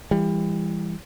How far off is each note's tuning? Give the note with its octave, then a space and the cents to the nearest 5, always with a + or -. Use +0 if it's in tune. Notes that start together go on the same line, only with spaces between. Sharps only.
E3 +20 G3 +30